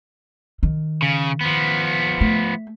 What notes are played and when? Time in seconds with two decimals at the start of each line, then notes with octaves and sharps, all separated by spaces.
0.63 D#3
1.02 C#3
1.41 F3 B3
2.21 A3